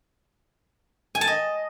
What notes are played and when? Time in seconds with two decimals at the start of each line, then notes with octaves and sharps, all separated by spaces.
1.15 G#5
1.21 A5
1.27 D#5